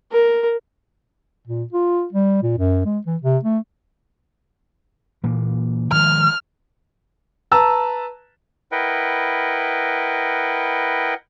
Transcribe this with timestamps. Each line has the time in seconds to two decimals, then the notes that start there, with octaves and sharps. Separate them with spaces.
0.12 A#4
1.47 A#2
1.72 F4
2.12 G3
2.43 A#2
2.58 F#2
2.85 G#3
3.06 E3
3.21 C3
3.43 A3
5.23 A#2 E3 A#3
5.92 D#3 F3 G#3 F6
7.51 B4 A5 A#5 E6
8.72 E4 A#4 B4 D#5 F#5 G5